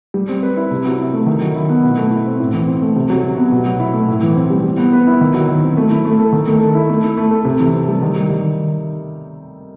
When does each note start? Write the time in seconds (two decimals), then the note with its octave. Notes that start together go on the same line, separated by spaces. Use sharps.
0.14 G3
0.29 C4
0.43 B4
0.57 E4
0.71 C3
0.85 F#3
0.99 E4
1.13 A3
1.26 D#3
1.42 F#3
1.55 E4
1.69 B3
1.83 B2
1.98 A3
2.11 E4
2.26 C4
2.40 A2
2.54 E3
2.68 C4
2.82 A3
2.96 C3
3.10 F#3
3.24 C3
3.37 B3
3.52 B2
3.66 F#3
3.80 E4
3.94 A3
4.08 A2
4.23 E3
4.36 C4
4.50 G3
4.64 G3
4.78 B3
4.93 B4
5.07 E4
5.21 D#3
5.34 F#3
5.49 D#3
5.63 C4
5.77 A3
5.91 E4
6.05 A3
6.20 A4
6.32 D#3
6.47 A3
6.61 A4
6.75 E4
6.89 A3
7.04 E4
7.18 A3
7.31 A4
7.45 C3
7.60 E3
7.73 C4
7.88 G3
8.02 D#3
8.16 G3
8.30 D#3